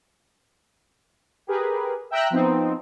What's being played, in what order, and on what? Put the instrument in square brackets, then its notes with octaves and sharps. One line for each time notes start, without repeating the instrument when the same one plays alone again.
[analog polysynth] G4 G#4 A#4 B4
E5 G5 A#5 E6 F#6
F3 B3 C4 D#4